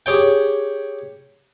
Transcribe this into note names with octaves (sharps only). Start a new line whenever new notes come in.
G4 G#4 C#5 G5